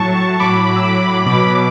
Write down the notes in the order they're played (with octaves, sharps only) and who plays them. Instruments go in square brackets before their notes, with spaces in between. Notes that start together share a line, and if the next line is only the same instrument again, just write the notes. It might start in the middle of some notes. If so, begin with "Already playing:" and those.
Already playing: [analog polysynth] A2 F#3 A5 C#6
A2 F#3 B5 D6
E6
B5 D6
B2 F#3 B5 D6
D6